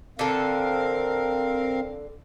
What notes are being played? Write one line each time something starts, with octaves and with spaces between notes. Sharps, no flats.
D3 C4 A4 A#4 F5